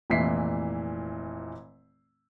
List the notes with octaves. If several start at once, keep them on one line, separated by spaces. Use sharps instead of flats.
F1 A#2 E3 E4 B6 C7